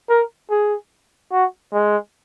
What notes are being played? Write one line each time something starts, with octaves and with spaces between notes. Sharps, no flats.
A#4
G#4
F#4
G#3